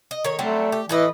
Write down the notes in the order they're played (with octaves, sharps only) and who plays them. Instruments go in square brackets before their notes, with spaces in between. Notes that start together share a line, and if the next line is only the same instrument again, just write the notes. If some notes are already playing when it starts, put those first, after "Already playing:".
[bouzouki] D#5
D#3 C#5
[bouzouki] F#3 G3 C4 [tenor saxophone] A3
[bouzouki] G4
[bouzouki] A2 B4 D#5 [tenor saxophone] E3